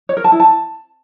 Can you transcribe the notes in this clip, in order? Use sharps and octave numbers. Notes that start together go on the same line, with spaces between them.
C#5
A#4
A5
E4
A5